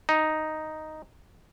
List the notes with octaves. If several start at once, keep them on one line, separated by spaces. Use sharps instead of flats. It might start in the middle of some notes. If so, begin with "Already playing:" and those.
D#4